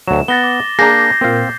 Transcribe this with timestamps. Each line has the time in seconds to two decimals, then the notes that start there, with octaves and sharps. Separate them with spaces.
0.08 D2 F#3 E7
0.28 B3 F#5 A6 A#6 G7
0.44 D6
0.79 A#3 D4 G#4 A#5 G6 A#6 C7
1.21 A#2 A#3 C4 F5